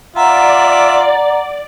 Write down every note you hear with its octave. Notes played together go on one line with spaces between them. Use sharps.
F4 D5 E5 F#5 A#5